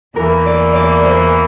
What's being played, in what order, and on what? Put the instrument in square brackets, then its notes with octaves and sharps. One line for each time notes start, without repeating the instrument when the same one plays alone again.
[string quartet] E2 E3 A#3 [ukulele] A#4
[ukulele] D5
D5
C5